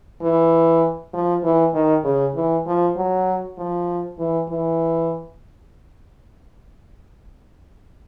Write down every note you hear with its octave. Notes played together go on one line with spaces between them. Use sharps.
E3
F3
E3
D#3
C#3
E3
F3
F#3
F3
E3
E3